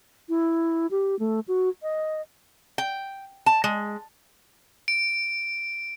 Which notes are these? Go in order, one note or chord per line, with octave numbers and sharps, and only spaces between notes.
E4
G4
A3
F#4
D#5
G5
A5
G#3
D7